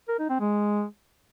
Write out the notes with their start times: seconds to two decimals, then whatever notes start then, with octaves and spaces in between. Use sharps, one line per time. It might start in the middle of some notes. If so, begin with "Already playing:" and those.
0.09 A#4
0.19 D#4
0.30 C4
0.40 G#3